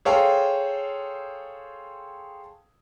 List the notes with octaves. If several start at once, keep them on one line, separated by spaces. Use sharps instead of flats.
G#4 A4 C5 C#5 F5 G5